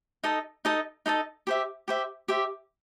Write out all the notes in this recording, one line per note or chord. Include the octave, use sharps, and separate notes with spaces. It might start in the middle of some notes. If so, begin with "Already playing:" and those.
D#4 A4 D#5 A5
D#4 A4 D#5 A5
D#4 A4 D#5 A5
G4 C5 E5
G4 C5 E5
G4 C5 E5